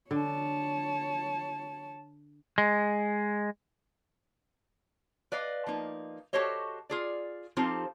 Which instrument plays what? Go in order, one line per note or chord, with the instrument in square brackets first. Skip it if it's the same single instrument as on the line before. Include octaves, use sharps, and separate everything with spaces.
[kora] D3 [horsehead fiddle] C#5 A5
[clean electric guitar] G#3
[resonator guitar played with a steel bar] B4 D5 D#5 F5
F3 A#3 D#4
F#4 G4 A4 C5 C#5 D#5
F4 G#4 D5
F3 C4 D#4 F4 G4 A4